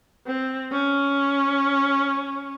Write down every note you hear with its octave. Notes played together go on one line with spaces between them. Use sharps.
C4
C#4